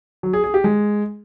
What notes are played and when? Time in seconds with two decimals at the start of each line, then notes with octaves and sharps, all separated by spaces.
0.23 F#3
0.33 G#4
0.44 G#4
0.54 G4
0.64 G#3